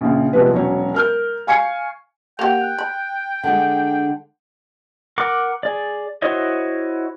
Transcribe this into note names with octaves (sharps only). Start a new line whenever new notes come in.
A#1 C#3
C3 F3 G3 G#3 B3 B4
E1 F#3 C#4 C#5
A#4 F6 G6
F5 G#5 C#6 G#6 C7 C#7
A#3 G4 F#5 G5 F7
F#6
B5
D3 G#3 F#5 A5
A#4 F#5 D6
G#4 D5
E4 F#4 C5 C#5 D#5